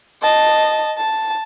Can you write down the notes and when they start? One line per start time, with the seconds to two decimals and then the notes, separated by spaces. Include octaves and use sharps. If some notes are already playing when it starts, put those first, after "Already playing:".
0.22 D#5 A5
0.97 A5